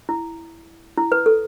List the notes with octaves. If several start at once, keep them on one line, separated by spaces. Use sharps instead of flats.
E4
E4
B4
A4